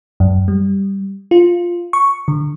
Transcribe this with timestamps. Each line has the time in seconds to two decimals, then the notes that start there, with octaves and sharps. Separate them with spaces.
0.20 F#2
0.48 G3
1.31 F4
1.93 C#6
2.28 D3